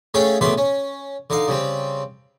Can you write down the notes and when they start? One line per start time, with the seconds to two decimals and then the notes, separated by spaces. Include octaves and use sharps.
0.14 A3 C#4 G#4 A4 F5 G5
0.41 D2 C#3 B3 D4 E5 C6
0.58 C#4
1.30 D3 D#4 F5
1.48 C#3 G3 C4